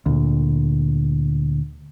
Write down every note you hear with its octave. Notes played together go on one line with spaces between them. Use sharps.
D2 A#2